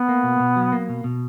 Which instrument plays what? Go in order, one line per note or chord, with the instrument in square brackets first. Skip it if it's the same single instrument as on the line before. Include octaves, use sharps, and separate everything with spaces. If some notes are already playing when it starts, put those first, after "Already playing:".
Already playing: [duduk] B3
[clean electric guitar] A#3
B2
B2
F#3
A#3
B2
B2